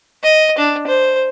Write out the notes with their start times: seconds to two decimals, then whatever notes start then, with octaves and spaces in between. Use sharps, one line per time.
0.23 D#5
0.58 D4
0.87 C5